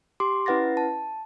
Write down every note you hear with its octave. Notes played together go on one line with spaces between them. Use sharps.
G4 C6 D6
C#4 E4 B4 F#5 A6 A#6
A5